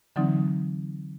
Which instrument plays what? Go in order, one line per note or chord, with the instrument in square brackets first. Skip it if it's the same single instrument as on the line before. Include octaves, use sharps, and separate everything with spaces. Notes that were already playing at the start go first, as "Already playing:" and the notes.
[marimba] D3 E3 F#3 C4 D#4